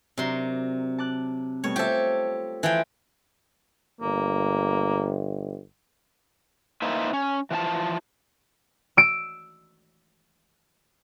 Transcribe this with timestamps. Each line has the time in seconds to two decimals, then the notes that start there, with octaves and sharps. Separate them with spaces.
0.18 C3 F#3 D4 A#4 C6
0.99 A5 D6 F#6
1.64 B2 G3 A3 C#5
1.76 F4 G4 A4 C5 E5
2.63 E3 F3 G5
4.01 G1 A#3
6.82 A#3 D#4 E4 B4 C5 E5
7.13 C#4
7.51 E3 F3 F5 A5
8.97 E6 D7